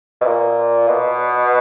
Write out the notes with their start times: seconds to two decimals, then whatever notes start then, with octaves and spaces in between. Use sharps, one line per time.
0.21 B2
0.26 A#2
0.88 B2